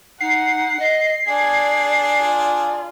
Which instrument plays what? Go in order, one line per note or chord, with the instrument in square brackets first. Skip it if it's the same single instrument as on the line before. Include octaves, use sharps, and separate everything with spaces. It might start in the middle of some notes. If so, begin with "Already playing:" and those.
[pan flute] D#4 [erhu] F#5 [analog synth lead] C7
[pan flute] D#5
[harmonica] D4 G#4 [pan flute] D5 [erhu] G#6
[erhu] F4